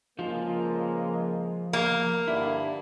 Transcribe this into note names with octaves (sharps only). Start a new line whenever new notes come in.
C#2 F3 G#3 A#3 F4
A#3
G2 D3 E4